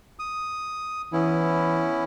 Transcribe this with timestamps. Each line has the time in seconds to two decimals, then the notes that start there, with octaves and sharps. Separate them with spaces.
0.19 D#6
1.13 E3 B3 C#4 E4